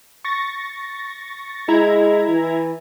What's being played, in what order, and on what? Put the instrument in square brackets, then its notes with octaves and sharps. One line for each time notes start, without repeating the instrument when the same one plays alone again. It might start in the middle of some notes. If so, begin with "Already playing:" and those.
[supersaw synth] C#6 A6 A#6
[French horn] G#3 [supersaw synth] E4 A#5 G#6
[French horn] E3